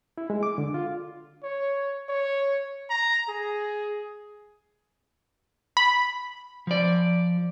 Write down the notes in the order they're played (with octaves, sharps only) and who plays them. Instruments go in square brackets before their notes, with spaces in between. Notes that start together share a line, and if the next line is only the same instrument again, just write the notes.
[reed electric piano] E4
G#3
D6
D3
F4
[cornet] C#5
C#5
A#5
G#4
[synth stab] B5
[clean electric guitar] F3 D5